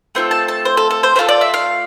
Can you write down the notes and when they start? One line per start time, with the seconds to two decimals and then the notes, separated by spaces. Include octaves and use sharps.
0.15 A3 C4 F4 A4
0.31 A5
0.48 A5
0.65 C5
0.77 A4
0.91 A4
1.03 C5
1.16 A3 D4 F4 A4 C5
1.29 D5
1.41 E5
1.54 F5